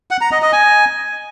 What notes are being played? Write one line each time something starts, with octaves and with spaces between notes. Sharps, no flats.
F#5
A#5
D#5
D#5
G#5